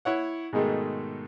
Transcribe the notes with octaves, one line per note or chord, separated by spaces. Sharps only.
E4 C#5 F#5
G#2 B2 D#3 G#3 A3